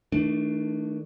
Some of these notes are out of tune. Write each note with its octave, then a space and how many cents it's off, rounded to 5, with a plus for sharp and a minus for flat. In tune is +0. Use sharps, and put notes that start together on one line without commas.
D#3 +40 A3 +0 D4 +10